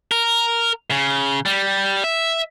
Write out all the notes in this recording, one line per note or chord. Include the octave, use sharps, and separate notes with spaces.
A#4
C#3
G3
E5